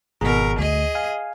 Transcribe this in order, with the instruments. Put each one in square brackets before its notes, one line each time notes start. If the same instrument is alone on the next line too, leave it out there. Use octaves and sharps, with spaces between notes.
[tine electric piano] G#1 G#4 A#5 [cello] B2 A#4
[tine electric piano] D2 [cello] G#4 D#5
[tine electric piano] F5 G#5